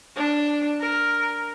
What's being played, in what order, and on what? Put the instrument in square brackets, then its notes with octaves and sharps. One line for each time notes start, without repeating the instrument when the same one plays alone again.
[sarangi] D4
A#4